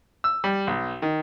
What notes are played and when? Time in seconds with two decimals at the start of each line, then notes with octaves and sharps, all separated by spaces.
0.24 E6
0.44 G3
0.67 B1
1.02 D#3